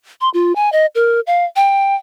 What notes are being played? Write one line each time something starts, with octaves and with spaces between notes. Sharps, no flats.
C6
F4
G#5
D#5
A#4
F5
G5